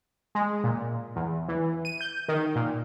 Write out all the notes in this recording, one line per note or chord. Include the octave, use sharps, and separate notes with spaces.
G#3
A#2
E2
E3
D#7
G6
D#3
A#2